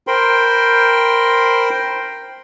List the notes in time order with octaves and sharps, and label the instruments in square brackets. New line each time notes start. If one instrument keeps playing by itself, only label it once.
[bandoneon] A#4 C5 G5 B5 C6